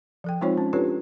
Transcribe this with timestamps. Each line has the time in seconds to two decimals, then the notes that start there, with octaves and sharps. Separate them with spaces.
0.24 F3 A4 G5
0.41 G#3 C4 D#4 F4 C5 C#5
0.58 C#4
0.73 D4 F4 G4 A4 B4 C#5